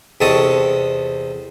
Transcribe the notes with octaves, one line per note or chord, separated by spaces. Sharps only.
E2 C3 C4 A4 D#5 C#6